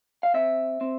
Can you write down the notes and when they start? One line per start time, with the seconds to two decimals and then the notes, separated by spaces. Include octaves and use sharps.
0.23 F5
0.34 C4 E5
0.81 C4